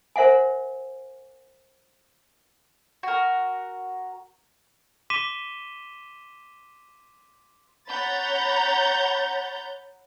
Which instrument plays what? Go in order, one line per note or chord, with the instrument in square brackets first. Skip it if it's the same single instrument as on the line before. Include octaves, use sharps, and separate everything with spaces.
[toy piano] A#4 C5 E5 F#5 G#5
[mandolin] F#4 A#4
[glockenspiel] C6 D6 B6 D#7 E7 G7
[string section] C#5 F#5 A#5 B5 G6 A6